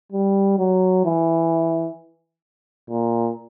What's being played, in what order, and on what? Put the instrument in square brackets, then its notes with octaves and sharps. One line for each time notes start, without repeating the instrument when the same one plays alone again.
[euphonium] G3
F#3
E3
A#2